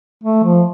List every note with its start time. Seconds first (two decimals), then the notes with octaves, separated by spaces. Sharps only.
0.24 A3
0.44 F3